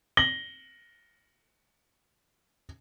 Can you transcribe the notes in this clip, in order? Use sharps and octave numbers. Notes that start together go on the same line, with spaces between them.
A#6 F#7 G7